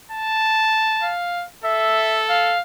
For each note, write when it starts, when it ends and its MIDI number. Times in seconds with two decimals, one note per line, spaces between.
0.11 1.14 81
1.02 1.43 77
1.64 2.56 69
1.64 2.21 76
2.29 2.60 77